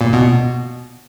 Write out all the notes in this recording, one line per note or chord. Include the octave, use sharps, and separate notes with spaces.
A#2
B2